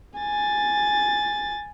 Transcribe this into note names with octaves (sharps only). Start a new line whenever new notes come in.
G#5 A6